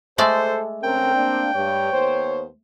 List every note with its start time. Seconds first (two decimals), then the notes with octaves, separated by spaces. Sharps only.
0.18 G#3 A3 A4 C5 D5
0.84 D3 C4 C#4 A#4 G5
1.15 A#3 D4
1.55 G2 C#5
1.93 D#2 B3 C5